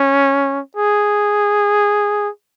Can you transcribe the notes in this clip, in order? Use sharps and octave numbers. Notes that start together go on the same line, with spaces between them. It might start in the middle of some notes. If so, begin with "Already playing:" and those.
Already playing: C#4
G#4